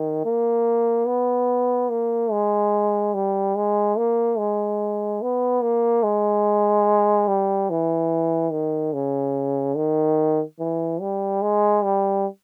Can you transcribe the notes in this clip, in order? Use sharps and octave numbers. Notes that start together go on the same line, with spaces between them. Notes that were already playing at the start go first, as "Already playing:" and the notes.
Already playing: D#3
A#3
B3
A#3
G#3
G3
G#3
A#3
G#3
B3
A#3
G#3
G3
E3
D#3
C#3
D#3
E3
G3
G#3
G3